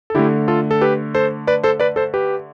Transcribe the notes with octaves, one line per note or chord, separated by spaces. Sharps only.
A4
D3 A3 E4 G4
F4 A4
A4
G4 B4
A4 C5
B4 D5
A4 C5
B4 D5
A4 C5
G4 B4